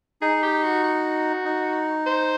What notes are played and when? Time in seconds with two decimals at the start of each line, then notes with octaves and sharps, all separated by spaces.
0.22 D#4 G#4
0.42 G4
0.63 F#4
0.84 F#4
1.45 D#4
2.06 C5